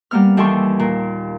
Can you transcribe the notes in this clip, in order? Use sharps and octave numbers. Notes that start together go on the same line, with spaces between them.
G3 A#3 B3 F6
D#2 E3 G4 A4 C6 C#6
A#2